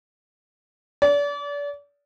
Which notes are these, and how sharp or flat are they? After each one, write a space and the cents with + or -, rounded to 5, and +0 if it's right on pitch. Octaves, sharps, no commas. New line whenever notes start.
D5 -35